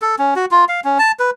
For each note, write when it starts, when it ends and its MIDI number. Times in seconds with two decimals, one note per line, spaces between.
0.02 0.16 69
0.18 0.34 61
0.36 0.45 66
0.51 0.65 65
0.69 0.81 77
0.84 0.98 61
0.99 1.12 81
1.19 1.31 71